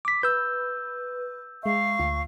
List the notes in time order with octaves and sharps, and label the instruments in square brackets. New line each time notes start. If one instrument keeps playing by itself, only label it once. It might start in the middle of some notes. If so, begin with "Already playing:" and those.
[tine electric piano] D6 B6
[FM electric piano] B4 [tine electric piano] E6 G6
[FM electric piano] G#3 E5 [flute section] F5 C#6
[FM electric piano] D2 F4